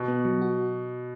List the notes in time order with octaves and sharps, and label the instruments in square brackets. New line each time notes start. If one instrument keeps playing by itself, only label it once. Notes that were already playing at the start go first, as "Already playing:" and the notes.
Already playing: [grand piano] B2
[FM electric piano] B3
F#3
F#4